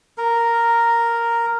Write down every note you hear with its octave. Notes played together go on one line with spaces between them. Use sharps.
A#4